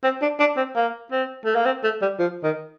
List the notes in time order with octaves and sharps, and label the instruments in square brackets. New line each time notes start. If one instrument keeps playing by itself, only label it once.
[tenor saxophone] C4
D4
D4
C4
A#3
C4
A3
A#3
C4
A3
G3
F3
D#3